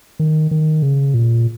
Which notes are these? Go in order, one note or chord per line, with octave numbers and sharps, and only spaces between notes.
D#3
D#3
C#3
A#2